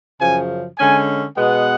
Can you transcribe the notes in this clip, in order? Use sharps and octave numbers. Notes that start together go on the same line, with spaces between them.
F#2 C#3 F3 G#5
D3 G#3 C#4 G#5
B2 G#3 B3 F#5